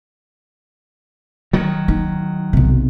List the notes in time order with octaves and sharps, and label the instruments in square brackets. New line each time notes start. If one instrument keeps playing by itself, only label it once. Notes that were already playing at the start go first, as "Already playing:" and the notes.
[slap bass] D#3 F#3
[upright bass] D#4
B1 C3